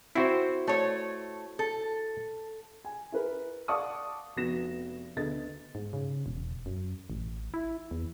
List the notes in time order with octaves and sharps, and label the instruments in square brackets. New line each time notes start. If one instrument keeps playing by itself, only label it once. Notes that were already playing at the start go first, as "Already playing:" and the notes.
[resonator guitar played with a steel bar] C4 [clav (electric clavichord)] E4 F#4 C5
[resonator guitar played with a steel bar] A3 C#5
A4
[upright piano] G#5
E4 A#4 B4
D5 F5 F#5 A5 C#6 D#6
F1 B3 F#4 A#6 E7
D2 B3 A4 D#5 A6
[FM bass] G#2
C#3
E1
F#2
A1
E4
E2